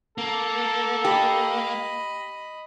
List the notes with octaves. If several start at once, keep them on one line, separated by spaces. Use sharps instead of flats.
A#3 A4
G4 D#5 B5